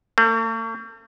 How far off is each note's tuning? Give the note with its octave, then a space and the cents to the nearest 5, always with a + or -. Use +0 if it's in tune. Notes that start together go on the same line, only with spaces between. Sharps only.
A3 +45